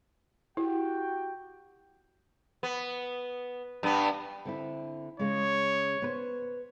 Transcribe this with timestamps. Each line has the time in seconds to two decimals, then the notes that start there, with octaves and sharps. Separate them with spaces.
0.57 E4 F#4 G4 G5
2.63 B3
3.83 G2 B3
4.45 D3 C4 E4
5.19 C#3 G#3 C#5
6.02 B3 B4 C5